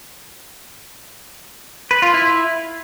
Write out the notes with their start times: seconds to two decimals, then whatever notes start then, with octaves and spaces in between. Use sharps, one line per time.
1.91 B4
2.02 F4
2.14 E4